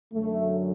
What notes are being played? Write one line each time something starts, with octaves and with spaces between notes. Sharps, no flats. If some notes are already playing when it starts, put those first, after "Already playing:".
F#2 D3 F#3 A3